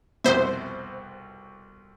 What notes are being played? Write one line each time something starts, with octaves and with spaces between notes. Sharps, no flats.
C2 F2 B2 C5 E5